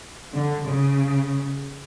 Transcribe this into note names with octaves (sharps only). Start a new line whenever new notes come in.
D3
C#3